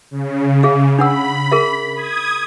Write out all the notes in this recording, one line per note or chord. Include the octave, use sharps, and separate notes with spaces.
C#3
G#4 E5 F5
D4 F#5 B5 E6
G#4 A#4 E5
D#6 G#6